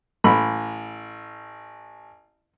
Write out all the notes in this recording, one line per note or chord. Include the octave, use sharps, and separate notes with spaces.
A1 B5